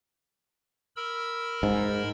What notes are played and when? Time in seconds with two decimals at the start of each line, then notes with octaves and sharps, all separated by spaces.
0.96 A#4 B5 E6
1.63 G#2